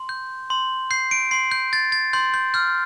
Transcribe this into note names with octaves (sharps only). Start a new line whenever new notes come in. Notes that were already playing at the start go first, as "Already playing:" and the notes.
Already playing: C6
G6
C6
G6 C7
D7
C6 C7
G6
G6 A6
A6
C6 G6
G6
F6 G6